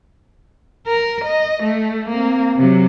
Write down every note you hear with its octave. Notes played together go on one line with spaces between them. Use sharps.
A#4
D#5
A3
A#3 C4
C3 F#3